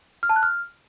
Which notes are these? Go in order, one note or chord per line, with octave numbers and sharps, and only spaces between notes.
F6
A5
F#6
F6